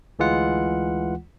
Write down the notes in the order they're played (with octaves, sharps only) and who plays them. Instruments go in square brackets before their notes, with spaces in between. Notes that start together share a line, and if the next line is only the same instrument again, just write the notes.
[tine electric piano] D2 E3 G#3 F4 F#5